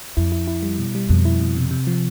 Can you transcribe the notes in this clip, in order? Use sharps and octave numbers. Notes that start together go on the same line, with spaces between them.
F2 E4
E4
E4
G3
B2
G3
F2 B2
E4
B2
C3
C3
F3